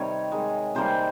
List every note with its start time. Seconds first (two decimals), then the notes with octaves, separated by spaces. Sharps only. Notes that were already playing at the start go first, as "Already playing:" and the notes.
Already playing: C3 D#3 G3 C#5
0.32 D#3 G#3
0.75 C3 D#3 G3 A#3 C5